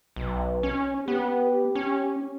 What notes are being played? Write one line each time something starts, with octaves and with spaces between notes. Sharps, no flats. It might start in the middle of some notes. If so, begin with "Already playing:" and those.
B1
C#4
B3 G4
C#4